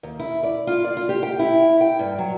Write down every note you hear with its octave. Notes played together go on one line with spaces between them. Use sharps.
D#2
E4
D5
F4
D5
F4
G4
G5
E4
G5
G2
F#3